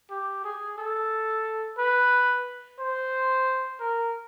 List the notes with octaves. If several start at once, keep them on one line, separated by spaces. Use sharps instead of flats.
G4
G#4
A4
B4
C5
A#4